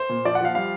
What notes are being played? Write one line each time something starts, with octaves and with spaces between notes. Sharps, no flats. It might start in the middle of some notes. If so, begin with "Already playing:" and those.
Already playing: C5
A#2
F3 D5
F#5
F3 F5
G3 F5